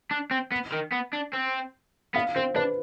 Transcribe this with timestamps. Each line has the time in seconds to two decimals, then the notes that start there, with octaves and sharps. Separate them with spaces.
0.11 D4
0.31 C4
0.52 B3
0.72 D#3
0.92 B3
1.13 D4
1.33 C4
2.15 B3 F5
2.36 C4 C5
2.56 D4 B4